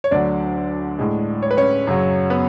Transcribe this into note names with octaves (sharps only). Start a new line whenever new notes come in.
C#5
D2 D3 F#3 D4 D5
A2 G#3
C#5
B4
C#4 C#5
F#2 C#3 F#3
B3 B4